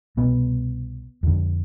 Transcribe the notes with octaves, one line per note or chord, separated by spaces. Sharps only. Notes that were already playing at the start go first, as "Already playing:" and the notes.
C2 B2 B3
F2 D3